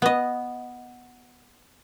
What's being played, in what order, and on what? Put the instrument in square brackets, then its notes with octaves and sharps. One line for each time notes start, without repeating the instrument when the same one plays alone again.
[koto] B3 D#5